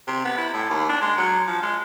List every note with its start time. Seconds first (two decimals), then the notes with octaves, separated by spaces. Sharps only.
0.07 C3
0.25 B3
0.37 E4
0.53 A2
0.70 D#2
0.89 D4
1.01 G#3
1.17 F#3
1.47 F3
1.62 G#3